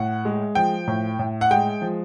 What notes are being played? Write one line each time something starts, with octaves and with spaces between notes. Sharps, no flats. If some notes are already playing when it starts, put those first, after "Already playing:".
Already playing: A2 F#5
G#3
F3 G5
A2
A2
F#5
G#3 G5
F3